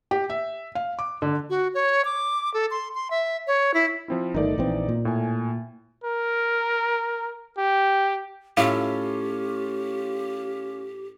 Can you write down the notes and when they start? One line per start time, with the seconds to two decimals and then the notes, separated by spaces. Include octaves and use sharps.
0.11 G4
0.30 E5
0.75 F5
0.99 D6
1.22 D3
1.50 F#4
1.74 C#5
2.05 D6
2.54 A4
2.71 C6
2.95 C6
3.11 E5
3.47 C#5
3.74 E4
4.08 F3 C4 E4
4.34 G1 D#3 A3 D#4 D5
4.58 A#1 E3 C4
4.89 A#2
5.05 A2 G#5
6.04 A#4
7.58 G4
8.57 A2 C#4 F4 G4 E5 F5